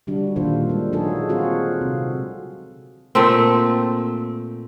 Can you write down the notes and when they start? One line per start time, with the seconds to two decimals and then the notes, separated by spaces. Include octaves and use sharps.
0.07 D3 G3 D4 F#4
0.36 A#2 D3 D#3 F4 A4 C5
0.69 G#3 D4
0.92 F#3 D#4 F#4 G#4 A4
1.29 C4 F4 F#4 G#4
1.81 C3
3.15 A#2 A3 C4